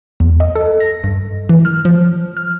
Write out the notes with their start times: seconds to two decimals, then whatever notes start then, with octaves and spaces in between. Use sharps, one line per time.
0.20 E2
0.40 D#5
0.55 A4
0.80 A#6
1.04 G2
1.49 E3
1.65 F6
1.85 F3
2.37 F6